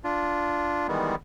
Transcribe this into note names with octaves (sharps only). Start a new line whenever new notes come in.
D4 F4
D#3 E3 G3 G#3 B3